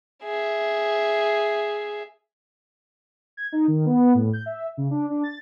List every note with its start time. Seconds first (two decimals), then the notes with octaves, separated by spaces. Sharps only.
0.24 G#4 E5
3.37 G#6
3.52 D#4
3.68 D#3
3.86 B3
4.14 A2
4.33 G6
4.46 E5
4.77 C#3
4.91 D4
5.10 D4
5.23 A6